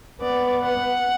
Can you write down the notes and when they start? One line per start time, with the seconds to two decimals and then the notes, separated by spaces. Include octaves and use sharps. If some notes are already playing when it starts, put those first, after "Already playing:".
0.22 B3 D5
0.64 F#5